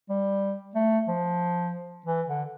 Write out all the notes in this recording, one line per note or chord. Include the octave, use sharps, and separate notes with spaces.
G3
A3
F3
E3
D3